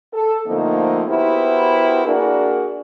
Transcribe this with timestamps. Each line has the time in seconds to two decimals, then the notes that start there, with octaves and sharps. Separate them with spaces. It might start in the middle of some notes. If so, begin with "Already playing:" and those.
0.14 A4
0.47 D3 F3 A3 A#3 C4 D#4
1.08 B3 E4 F#4 G4 A#4 C5
2.05 A#3 D4 F#4 G#4 A#4